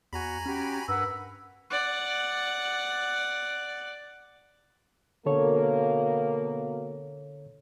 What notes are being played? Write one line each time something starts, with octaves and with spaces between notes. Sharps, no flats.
E2 F#4 G#5 A#5 B5
C#4 F#4 G4
G2 A#4 B4 F#5 E6
D5 F#5
B2 D3 A#3 A4 C#5